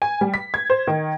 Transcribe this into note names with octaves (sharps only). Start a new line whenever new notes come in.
G#5
G3
B6
G#6
C5
D#3